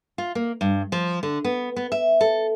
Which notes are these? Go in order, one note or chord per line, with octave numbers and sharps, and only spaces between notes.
F4
A#3
G2
F3
D3
B3
B3
E5
A4